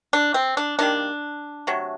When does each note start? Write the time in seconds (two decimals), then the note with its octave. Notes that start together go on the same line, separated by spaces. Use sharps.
0.13 D4
0.34 C4
0.57 D4
0.79 D#3 G3 A#3 D4
1.67 C3 F#3 A3